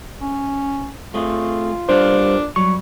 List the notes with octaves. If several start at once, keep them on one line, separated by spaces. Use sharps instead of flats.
C#4
A3 C4 F4 G#4
A#2 G3 B3 D4 C5 F5
F#3 G3 C#6